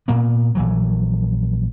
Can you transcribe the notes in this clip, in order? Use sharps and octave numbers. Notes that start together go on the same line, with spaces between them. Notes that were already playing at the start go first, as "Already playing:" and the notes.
A#2 A#3 B3
A#1 E3 F#3